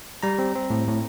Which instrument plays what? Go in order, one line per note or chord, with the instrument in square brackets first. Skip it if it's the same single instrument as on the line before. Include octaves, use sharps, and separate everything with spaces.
[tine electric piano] G3 A#5
C4
C4
A2
A2